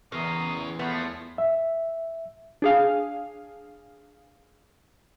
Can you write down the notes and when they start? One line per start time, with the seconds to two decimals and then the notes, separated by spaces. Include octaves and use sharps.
0.12 E2 A2 C#3 A#4 C6 D#6
0.79 F3 A3 B3 C5 C#5
1.38 E5
2.62 D4 G#4 F5